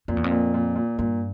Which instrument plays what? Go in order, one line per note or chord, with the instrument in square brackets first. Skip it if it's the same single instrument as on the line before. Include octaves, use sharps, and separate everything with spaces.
[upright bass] F2 [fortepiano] A#2
[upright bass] E2
F2
[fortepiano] A#2
A#2
A#2
[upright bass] G2 [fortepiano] A#2